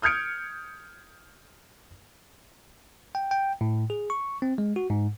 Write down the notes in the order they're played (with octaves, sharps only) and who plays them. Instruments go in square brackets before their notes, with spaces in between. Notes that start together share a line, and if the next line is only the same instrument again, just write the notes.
[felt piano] D#6 F6 G6 G#6 C#7 D7
[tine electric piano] G5
G5
A2
G#4
C#6
C4
G#3
F#4
G#2